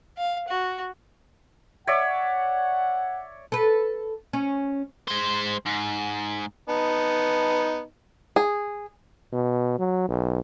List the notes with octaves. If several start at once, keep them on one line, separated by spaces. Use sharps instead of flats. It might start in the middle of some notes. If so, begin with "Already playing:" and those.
F5
F#4
C#5 D5 E5 F#5
A4 B4
C#4
G#3 C5
G#2
B3 D#4 A5
G#4
B2
F#3
B1